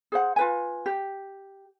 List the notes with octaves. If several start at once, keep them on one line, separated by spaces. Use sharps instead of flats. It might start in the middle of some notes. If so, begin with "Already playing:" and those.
G#4 C5 F#5
F4 B4 G#5
G4